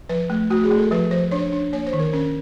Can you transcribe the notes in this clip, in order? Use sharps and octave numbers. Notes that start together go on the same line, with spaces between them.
F3 B4
A3
A3 F#4
G#4
A3
A4
F3 B4
F3 C5
D4 C#5
D4
A#3 C#5
C5
D#3
A#4
C#4 A#4